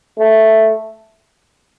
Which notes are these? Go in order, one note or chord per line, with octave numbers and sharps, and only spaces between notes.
A3